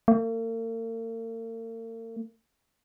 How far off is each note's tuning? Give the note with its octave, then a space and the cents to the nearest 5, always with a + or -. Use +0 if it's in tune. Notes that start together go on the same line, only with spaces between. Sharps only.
A#3 -45